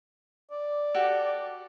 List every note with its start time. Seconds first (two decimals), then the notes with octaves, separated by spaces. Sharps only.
0.51 D5
0.94 F#4 G4 A4